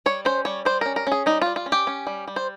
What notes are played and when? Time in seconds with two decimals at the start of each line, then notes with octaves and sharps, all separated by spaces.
0.06 G3 C#5
0.25 C#4 C5
0.45 G3 C#5
0.65 G3 C5
0.81 C#4 A#4
0.96 A#4
1.07 C#4 G#4
1.26 G3 D#4
1.42 G3 F4
1.56 F4
1.66 C#4
1.72 G4
1.87 C#4
2.07 G3
2.28 G3
2.36 C5